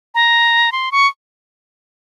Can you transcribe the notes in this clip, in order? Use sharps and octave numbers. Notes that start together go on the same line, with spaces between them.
A#5
C6
C#6